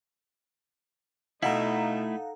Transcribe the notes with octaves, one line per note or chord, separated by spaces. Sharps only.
B2 A3 D#4 E4 A4 F5 F#5 A#5